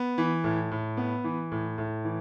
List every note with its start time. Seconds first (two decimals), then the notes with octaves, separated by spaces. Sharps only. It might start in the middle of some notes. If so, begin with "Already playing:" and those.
Already playing: B3
0.18 E3
0.44 A2
0.71 A2
0.97 B3
1.24 E3
1.52 A2
1.78 A2
2.05 E3